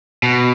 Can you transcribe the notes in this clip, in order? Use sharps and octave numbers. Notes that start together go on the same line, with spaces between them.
B2